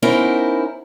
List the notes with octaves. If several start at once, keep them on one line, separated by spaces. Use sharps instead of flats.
B3 C#4 D#4 E4 A#4 C5